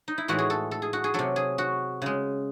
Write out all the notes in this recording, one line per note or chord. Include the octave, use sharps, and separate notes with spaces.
D#4
E4
A2 E3 G#3 F#4
G#4
A4
A4
G#4
F#4
G#4
C3 F#3 A4
G#4
F#4
C#3 G#3